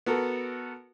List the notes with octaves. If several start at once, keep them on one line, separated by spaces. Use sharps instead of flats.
B3 F#4 A4 A#4